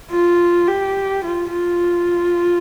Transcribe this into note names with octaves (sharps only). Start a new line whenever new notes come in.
F4
G4
F4
F4